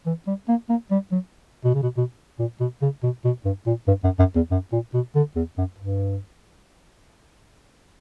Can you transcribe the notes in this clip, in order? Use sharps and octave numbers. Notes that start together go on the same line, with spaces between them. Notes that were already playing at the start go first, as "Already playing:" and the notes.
E3
G3
A#3
A#3
G3
F#3
B2
C#3
B2
B2
A#2
B2
C#3
B2
B2
G2
A#2
G2
F#2
F#2
E2
F#2
A#2
B2
D3
E2
F#2
G2